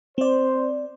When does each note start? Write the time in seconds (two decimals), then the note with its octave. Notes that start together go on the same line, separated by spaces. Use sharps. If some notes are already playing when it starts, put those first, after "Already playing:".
0.18 C4 C5 D5